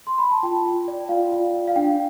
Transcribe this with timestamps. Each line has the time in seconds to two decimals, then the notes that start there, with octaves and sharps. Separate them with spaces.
0.07 C6
0.18 B5
0.31 A5
0.43 F4 G5
0.65 F4
0.88 D5
1.09 F4 F5
1.32 F4
1.54 F4
1.68 F5
1.76 D4 G5